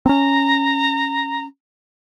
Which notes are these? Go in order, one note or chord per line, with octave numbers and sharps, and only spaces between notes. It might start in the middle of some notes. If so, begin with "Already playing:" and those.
C4 C#4 A#5